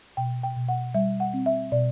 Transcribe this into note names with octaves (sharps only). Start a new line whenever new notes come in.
B2 G5
G5
B2
F#5
G3 E5
F#5
C4
E5
B2 D5